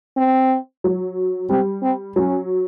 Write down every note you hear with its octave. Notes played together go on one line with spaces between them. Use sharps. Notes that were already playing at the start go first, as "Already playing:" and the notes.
C4
F#3
G3 C4
C4
F#3 C#4